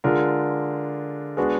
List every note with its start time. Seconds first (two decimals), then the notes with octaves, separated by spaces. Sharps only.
0.04 D3 G#3 D4 F4 A#4
1.37 G#3 B3 D4 F#4